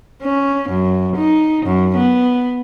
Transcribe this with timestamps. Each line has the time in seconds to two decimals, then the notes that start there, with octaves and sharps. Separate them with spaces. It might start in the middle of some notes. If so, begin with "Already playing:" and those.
0.22 C#4
0.70 F#2
1.16 D#4
1.66 F#2
1.97 B3